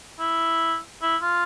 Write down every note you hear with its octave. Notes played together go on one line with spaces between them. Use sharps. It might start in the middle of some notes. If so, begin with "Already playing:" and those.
E4
E4
F4